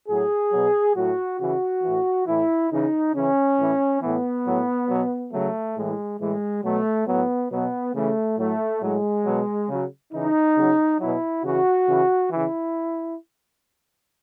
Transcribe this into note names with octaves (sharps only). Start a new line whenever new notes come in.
A2 F#3 G#4
B2 F#3
A2 F#3 F#4
C#3 E3 F#4
A2 E3
A2 E3 E4
C#3 E3 D#4
C#3 E3 C#4
A2 E3
A2 E3 B3
A2 F#3
B2 F#3
C#3 F#3 A3
A2 E3 G#3
A2 E3 G#3
B2 F#3 A3
A2 F#3 B3
B2 F#3 B3
C#3 E3 A3
A2 F#3 A3
A2 F#3 G#3
B2 F#3
C#3 F#3
C#3 E3 D#4
C#3 F#3
B2 F#3 E4
C#3 E3 F#4
C#3 E3
C#3 E3 E4